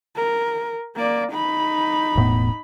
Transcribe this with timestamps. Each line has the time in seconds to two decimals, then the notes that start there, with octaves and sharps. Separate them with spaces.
0.16 A#4
0.96 A#3 D5
1.33 D#4 B5
2.16 E1 A2 B3